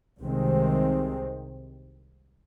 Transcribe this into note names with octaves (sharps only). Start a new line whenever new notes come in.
C2 C3 D#3 G#3 C4